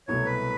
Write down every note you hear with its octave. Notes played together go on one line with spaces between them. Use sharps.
C2 B2 F#3 A3 C#5
B4